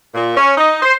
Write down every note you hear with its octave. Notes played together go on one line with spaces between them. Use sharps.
A#2
C#4
D#4
C5